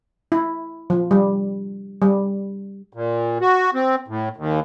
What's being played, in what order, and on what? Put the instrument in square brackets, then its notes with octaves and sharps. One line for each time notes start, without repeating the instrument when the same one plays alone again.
[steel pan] E4
F3
G3
G3
[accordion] A#2
F#4
C4
A2
D#2